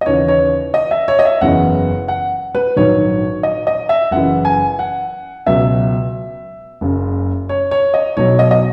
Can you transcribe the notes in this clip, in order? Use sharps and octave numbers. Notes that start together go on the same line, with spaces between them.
D#5
D#2 C#3 E3 C#5
C#5
D#5
E5
C#5
D#5
E5
F#1 E2 C#3 E3 F#5
F#5
B4
A#1 G#2 D#3 F#3 C#5
D#5
D#5
E5
F#1 F#2 E3 F#5
G#5
F#5
C#2 B2 F#3 E5
F#1 F#2 C#3
C#5
C#5
D#5
B1 B2 F#3 C#5
D#5
D#5